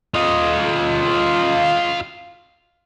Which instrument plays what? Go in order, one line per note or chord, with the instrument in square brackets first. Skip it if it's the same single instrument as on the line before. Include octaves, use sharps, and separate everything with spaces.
[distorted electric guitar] F4 D#5